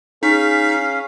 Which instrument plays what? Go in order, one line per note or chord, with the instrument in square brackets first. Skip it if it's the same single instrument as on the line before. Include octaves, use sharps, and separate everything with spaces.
[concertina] C#4 F5 [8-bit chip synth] D#4 [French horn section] G#4 [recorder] B6